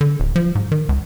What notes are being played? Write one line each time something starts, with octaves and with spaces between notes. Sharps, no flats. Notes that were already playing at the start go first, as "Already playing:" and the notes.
D3
D1
F3
G#2
D#3
C#2